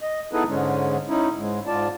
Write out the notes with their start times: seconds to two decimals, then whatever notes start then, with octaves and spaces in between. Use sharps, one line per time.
0.01 D#5
0.33 B3 D#4 E4 G#4 A4 B4
0.48 G#2 D3 G#3 C#4
1.09 C#4 D#4 E4
1.38 G#2 G#3
1.67 G#2 F4 D5 A5